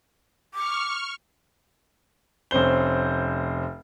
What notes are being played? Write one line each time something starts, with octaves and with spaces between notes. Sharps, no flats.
C#6 D6 F6
F1 C4 C#4 C5 G7